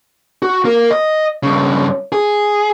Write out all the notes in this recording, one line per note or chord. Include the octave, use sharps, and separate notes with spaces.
F#4
A#3 A#4
D#5
G2 C#3
G#4